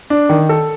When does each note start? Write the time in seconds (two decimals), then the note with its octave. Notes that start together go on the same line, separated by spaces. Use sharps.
0.10 D4
0.29 D#3
0.49 A4